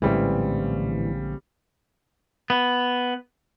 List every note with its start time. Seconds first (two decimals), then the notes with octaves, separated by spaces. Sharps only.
0.02 A#1 A2 D3 E3 G3 G#3 C4 C#4
2.50 B3